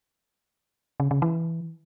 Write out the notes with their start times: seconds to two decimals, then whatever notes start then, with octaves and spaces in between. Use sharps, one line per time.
1.00 C#3
1.11 C#3
1.22 E3